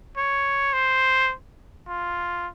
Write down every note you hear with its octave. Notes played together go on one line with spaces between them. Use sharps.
C#5
C5
F4